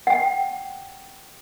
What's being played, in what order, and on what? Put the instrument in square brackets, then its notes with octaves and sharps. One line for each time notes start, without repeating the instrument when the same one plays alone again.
[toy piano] F#5 G5